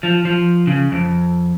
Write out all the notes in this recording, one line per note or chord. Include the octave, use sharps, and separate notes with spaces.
F3
F3
C#3
F2